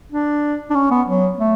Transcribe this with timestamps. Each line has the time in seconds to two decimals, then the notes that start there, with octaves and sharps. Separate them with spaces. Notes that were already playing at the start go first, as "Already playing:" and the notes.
0.12 D4
0.70 D4
0.75 C#4
0.91 B3
1.07 F#3
1.39 A3